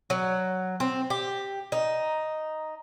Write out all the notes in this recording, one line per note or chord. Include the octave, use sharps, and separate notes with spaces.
F#3
C4
G4
D#4